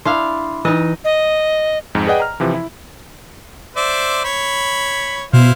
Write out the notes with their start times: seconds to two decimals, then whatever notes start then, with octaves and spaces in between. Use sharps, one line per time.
0.06 D4 E4 F5 C6
0.65 E3 D#4 D#5
1.04 D#5
1.95 F2 G#2
2.07 G#4 B4 D5 D#5 F#5 G5
2.20 A#5 F6
2.40 C3 E3 F3
2.54 E4
3.76 C5 D5 E5
4.24 C#5 B5
5.33 B2 E4 C5 F5